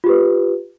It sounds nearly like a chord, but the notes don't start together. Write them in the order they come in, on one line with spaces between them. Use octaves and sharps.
F4 G4 B4